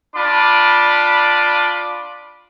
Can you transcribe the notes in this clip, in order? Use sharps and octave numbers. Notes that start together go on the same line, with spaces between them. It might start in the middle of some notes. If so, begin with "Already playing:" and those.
D4 F4 B5 D6